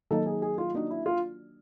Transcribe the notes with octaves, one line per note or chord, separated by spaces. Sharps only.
D#3 F#3 A#3 D#4 A4
G#4
G#4
F4
A#3 D4 D#4 F#4
E4
F4